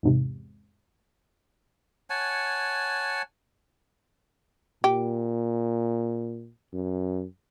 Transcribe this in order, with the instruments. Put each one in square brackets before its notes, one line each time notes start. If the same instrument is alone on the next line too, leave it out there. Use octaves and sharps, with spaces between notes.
[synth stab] E2 G#2 C3
[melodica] C#5 F#5 G#5 A5
[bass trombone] A#2 [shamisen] G4
[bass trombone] F#2